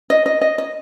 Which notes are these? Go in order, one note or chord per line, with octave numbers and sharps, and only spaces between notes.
D#5
D#5
D#5
D#5